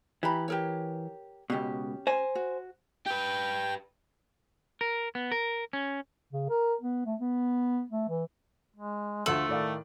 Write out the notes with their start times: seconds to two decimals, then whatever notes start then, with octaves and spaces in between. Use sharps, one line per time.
0.23 E3 G4 A#5 B5
0.48 G4 A#4 C#5
1.50 C#2 B2 C#4 G4
2.07 C5 G#5
2.35 F#4
3.06 G4 B4 G5
4.81 A#4
5.15 B3
5.32 A#4
5.73 C#4
6.33 C#3
6.49 A#4
6.81 B3
7.06 A3
7.20 B3
7.91 A3
8.09 E3
8.76 G#3
9.26 D2 A3 F4 A4 F#7
9.48 A2 D#3 D5 F5